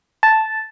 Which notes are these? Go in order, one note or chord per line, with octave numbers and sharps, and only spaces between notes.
A5